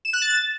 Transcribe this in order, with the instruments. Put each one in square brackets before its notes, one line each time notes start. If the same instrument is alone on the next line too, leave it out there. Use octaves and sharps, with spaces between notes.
[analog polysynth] E7
F#6
A6